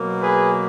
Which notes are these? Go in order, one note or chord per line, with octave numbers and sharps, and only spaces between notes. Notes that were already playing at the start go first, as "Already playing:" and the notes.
Already playing: B2 F#3 A#3
G#4 B4